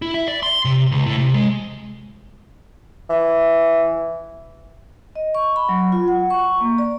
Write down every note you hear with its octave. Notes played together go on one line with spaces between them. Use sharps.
E4
E5
D5
C6
C3
C#2
A2
C3
G#3
E3
D#5
C#6
B5
F#3
F4
F#5
C#6
A#3
D5